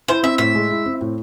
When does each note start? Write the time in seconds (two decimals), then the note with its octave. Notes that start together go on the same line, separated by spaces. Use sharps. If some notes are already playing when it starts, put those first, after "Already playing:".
0.08 E4 C5
0.23 C4 E5
0.38 A2 E5
0.55 G#3
0.71 E4
0.86 C4
1.01 A2